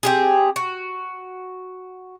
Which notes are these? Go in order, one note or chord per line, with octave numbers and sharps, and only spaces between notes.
C4 G4 G#4
F#4